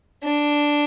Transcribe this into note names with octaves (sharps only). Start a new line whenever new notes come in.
D4